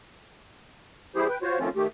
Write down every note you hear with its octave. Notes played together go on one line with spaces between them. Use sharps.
E3 G3 E4 G4 G#4 C5
B4 G5
F4 F#4 C5 C#5
D#3 F3 A3 C4 C#4 F4
D#3 A3 G4